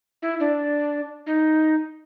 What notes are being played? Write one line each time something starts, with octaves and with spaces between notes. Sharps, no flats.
E4
D4
D#4